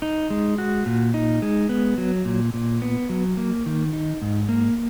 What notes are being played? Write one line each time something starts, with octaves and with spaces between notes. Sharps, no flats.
D#4
G#3
F#4
A#2
D#4
G#3
B3
F#3
A#2
A#2
B3
F#3
A#3
D#3
D#4
G#2
A#3